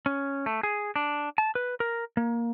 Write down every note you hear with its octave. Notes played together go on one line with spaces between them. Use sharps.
C#4
A3
G#4
D4
A5
B4
A#4
A#3